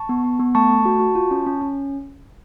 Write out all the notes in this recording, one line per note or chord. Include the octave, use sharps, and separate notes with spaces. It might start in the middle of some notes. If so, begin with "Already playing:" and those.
Already playing: A5 C#6
B3
B3
B3
A3 A5 C#6
A3
F#4
F#4
F4
C#4
C#4
C#4